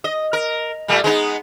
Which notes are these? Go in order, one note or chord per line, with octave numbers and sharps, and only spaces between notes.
D#5
A#4
A#2 G3 A3
G#3 B3 D#4